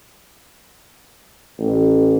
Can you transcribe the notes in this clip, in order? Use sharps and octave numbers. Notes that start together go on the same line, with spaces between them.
A1